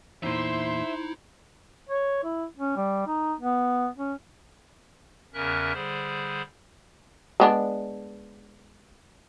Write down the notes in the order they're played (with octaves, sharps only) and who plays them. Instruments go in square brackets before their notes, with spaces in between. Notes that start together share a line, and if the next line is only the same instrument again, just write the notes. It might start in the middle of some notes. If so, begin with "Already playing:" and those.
[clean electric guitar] E2 A#2 [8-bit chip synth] D#4 E4 [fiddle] C5 C6 [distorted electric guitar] E5
[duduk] C#5
E4
C#4
G3
D#4
B3
C#4
[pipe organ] E2 C#3 C#4 A#4 E5 F#6
D3 G3 G#4 C5
[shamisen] G#3 B3 D4